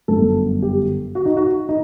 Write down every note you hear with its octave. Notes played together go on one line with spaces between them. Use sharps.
G1 F#2 D3 A3 A4
G4
F#4
D#4
F#4
D#4